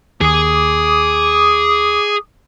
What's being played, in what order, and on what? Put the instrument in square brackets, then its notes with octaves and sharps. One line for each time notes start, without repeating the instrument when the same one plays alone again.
[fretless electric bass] D#2 [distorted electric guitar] G#4 [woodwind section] D6 D#6